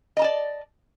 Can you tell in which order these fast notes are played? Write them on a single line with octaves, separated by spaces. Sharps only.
D#5 A#5 A5 D5